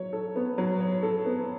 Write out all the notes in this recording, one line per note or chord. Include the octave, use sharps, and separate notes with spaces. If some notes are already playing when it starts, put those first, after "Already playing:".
Already playing: F#3 C#5
A4
B3
F#3
C#5
A4
B3